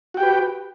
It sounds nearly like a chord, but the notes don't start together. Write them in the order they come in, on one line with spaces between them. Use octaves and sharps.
F#4 G5 G4 B4